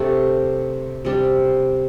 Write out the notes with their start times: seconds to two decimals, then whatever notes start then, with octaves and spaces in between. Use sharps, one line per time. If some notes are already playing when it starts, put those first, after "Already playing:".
Already playing: C3 A3 D4 G4
1.05 C3 G3 D4